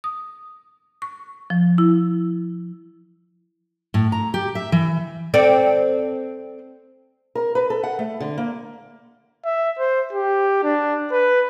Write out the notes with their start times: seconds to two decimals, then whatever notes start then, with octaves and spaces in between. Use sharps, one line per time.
0.04 D#6
1.02 C#6
1.50 F3
1.78 E4
3.94 A2
4.12 A#5
4.34 G4
4.55 E5
4.72 E3
5.34 C4 A4 D5
7.35 A#4
7.55 B4
7.70 A4
7.83 F#5
7.99 A3
8.20 D3
8.38 A#3
9.45 E5
9.79 C5
10.13 G4
10.63 D4
11.12 B4